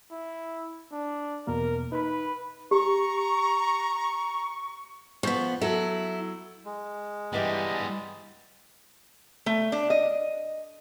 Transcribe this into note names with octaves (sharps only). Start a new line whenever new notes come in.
E4
D4
E2 B2 A#3 A#4
D#4 B4 B5
G4 A#5 C#6
F3 B3 C#6 G6 B6
F#3 E4 A4
G#3
G2 E3 G3 B3 G4 D#5
A3
D4
D#5